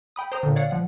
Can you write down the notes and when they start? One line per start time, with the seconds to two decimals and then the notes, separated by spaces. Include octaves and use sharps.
0.16 G5 B5 D#6
0.32 C5 G5 A#5 D#6
0.43 A#2 D3
0.56 C#5 D5 F5 F#5
0.71 F3 F#5